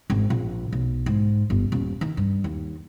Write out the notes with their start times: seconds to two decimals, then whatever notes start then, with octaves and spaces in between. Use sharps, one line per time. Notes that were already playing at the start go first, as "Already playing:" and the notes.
0.10 G#1
0.30 A#1
0.72 B1
1.06 G#2
1.50 G1
1.72 D#1
2.01 D#3
2.17 G2
2.44 D#2